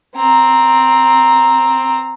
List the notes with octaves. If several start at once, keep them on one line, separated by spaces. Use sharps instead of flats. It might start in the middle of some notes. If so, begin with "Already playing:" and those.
C4 A#5